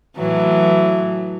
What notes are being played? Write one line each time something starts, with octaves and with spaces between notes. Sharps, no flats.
A2 E3 F#3